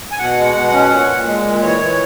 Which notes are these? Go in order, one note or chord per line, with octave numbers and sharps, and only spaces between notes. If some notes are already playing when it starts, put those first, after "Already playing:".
G#5
B2 F#5
G#3
B2
C#4
A#2
A#2
G#3
A#2
E3 C#5
E3